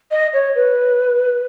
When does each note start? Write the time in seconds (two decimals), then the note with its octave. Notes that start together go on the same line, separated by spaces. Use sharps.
0.11 D#5
0.33 C#5
0.55 B4